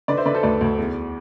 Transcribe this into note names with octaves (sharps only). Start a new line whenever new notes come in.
D3 B4 D5
C5 E5
D3 B4 D5
A4 C5
D2 B4 D5
D2
E2